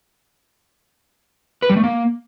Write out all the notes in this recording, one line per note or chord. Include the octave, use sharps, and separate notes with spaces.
B4
G3
A3
A#3